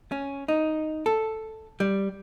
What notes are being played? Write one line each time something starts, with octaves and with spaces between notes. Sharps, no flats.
C#4
D#4
A4
G3